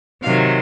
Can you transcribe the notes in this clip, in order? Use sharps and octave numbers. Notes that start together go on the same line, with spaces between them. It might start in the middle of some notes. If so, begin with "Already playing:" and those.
C3 D#3 F#3 F5